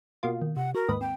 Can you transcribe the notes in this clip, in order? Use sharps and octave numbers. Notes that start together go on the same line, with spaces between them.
B2 A#3 F4
D#3
C3 F#5
F#4 A#4
D#2 G#2 B4 D#6
C4 G5